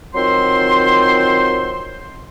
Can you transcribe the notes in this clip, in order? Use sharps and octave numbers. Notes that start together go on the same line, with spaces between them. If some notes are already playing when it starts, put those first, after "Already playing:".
D#3 F#3 C4 F4 C5 C6